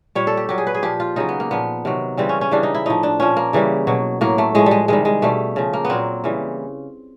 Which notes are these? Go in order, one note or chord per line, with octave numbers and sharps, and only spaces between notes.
A#2 G3 C#5
A4
G4
A#2 F#3 G4
G#4
B4
G#4
A#2 F3 G4
F4
C#3 F#3 D#4
B3
A#3
A#2 F3 B3
C3 D#3 F#3
C#3 E3 G3 C4
C#4
C#4
C#3 E3 G3 D4
D#4
E4
A2 F3 D#4
D4
A#2 F3 C#4
A#3
C#3 E3 G3
B2 F#3
A2 F#3 A#3
A3
A2 F3 G#3
G3 G#3
C3 D#3 G3 G#3
G#3
B2 G3 A3
C#3 F3
A#3
B3
A#2 F#3 C4
C#3 E3 G3